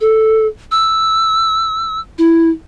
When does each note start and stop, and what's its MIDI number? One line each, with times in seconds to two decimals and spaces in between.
0.01 0.47 69
0.71 2.00 88
2.18 2.49 64